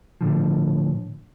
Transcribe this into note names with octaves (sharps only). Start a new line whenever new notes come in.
A2 D3 F3